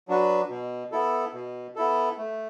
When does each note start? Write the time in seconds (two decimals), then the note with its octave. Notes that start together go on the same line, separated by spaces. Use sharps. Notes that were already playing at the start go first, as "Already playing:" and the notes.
0.08 F#3 D4 F#4 B4
0.50 B2
0.92 B3 E4 A4
1.34 B2
1.76 B3 E4 A4
2.17 A3